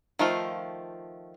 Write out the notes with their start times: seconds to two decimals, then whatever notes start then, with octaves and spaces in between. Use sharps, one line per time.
0.19 D#3 F3 A3 F4